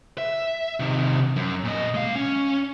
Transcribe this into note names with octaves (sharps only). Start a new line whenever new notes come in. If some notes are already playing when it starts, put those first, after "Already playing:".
E5
C3 D#3
F#2
A#2 D#5
G#3 F5
C#4